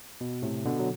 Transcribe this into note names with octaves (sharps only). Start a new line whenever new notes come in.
B2
A2 C3
B2 D3
F#3